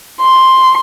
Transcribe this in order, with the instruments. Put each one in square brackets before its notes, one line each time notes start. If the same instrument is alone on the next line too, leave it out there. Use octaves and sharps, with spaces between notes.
[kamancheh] C6